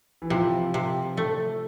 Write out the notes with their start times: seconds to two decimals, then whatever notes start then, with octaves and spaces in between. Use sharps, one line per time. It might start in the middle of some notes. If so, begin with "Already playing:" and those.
0.22 E3
0.30 C3 F3
0.74 C3
1.17 A3